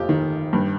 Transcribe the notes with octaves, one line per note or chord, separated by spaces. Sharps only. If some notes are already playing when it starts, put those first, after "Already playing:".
Already playing: F1 F4 G4
D#3
G2